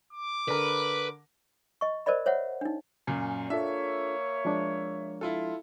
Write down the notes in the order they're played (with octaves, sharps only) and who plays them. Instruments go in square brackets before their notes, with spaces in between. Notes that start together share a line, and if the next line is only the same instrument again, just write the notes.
[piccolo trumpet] D6
[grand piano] D3 A#4 [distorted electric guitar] B4
[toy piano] D#5 C#6
A#4 C5 D5 D#5 B5
C5 C#5 E5 F#5
D4 D#4
[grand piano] F#2 A#2 [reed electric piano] G#5
[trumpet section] A#3 C#5 [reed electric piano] D4 F4 A4 [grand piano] E5
[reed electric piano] F3 G#3 D4
[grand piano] E4 F4 A4